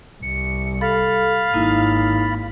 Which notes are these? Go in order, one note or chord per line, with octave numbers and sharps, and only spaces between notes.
C2 C#7
A4 F5 B5 A6 B6
G#1 A#3 D#4 E4